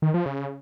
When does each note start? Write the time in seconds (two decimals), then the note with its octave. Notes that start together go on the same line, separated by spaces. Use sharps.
0.02 D#3
0.14 F3
0.26 C#3